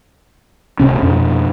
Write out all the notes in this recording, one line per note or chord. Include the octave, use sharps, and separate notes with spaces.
D1 G#1 C3 C#4
F2 B2